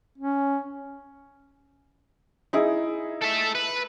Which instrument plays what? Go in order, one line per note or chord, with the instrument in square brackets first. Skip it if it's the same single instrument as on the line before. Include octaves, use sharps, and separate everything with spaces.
[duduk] C#4
[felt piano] D#4 E4 G#4
[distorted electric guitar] A4 E5
B4